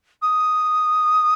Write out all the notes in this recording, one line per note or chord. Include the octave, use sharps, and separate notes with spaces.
D#6